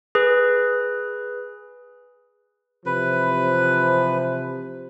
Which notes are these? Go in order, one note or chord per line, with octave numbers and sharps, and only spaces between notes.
G#4 B4
C3 E3 F3 B4